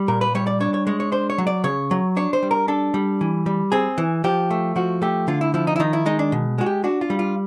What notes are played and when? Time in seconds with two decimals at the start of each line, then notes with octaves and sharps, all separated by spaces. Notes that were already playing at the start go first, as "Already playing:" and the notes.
Already playing: G3
0.08 A#2 A#4
0.21 B4
0.35 G3 C#5
0.47 D5
0.60 D4 C#5
0.74 C#5
0.87 G#3 C#5
1.00 C#5
1.12 D4 C5
1.30 C#5
1.38 F#3
1.47 D5
1.64 C#3 C#5
1.91 F#3
2.17 D4 C#5
2.33 C5
2.43 G3
2.51 A#4
2.68 D4 A4
2.94 G3
3.21 E3
3.46 G3
3.72 C4 G#4
3.98 E3
4.24 F3 G4
4.51 A3
4.76 F3 F#4
5.02 A3 G4
5.28 D3 F4
5.41 E4
5.54 F3 E4
5.67 D#4
5.76 E4
5.80 D#3 D#4
5.93 E4
6.06 G#3 D#4
6.19 D4
6.32 B2
6.58 G#3 F#4
6.66 G4
6.84 D4 F#4
7.01 F4
7.10 G3
7.19 F4